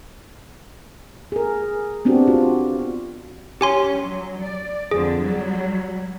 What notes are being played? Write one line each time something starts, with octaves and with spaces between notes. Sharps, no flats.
G#4 A#4
B3 C4 D4 F#4 G4
F4 F#4
C#4 G4 G#5 C6
F#3
D5
F2 D3 G#4
F#3 G3